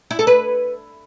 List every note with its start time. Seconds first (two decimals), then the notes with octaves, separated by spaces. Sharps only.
0.11 E4
0.19 A4
0.27 B4